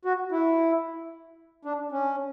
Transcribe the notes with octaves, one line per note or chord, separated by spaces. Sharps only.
F#4
E4
D4
C#4